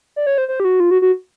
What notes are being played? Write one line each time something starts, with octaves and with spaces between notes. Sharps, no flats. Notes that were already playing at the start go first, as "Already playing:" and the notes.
D5
C#5
C5
C5
G4
F#4
F4
F#4
F#4